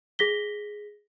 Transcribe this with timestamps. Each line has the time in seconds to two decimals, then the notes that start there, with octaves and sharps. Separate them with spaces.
0.19 G#4 A#6 B6 G7